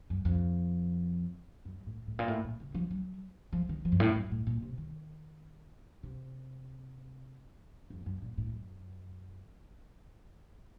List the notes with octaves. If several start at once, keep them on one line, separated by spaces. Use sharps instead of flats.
F#2
F2
F#2
A2
A2
A#2
A2
A#2
C#3
F3
F#3
F3
D#3
F3
F#2
A2
F#2
A2
A#2
C3
D#3
C3
F2
F#2
A#2
A2
F#2